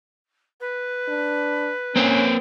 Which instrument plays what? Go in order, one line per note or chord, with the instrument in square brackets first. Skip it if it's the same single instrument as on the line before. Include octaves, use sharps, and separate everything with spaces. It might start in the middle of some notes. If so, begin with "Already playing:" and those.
[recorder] B4
[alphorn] D4
[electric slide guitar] A#3 C4 C5 [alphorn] C#4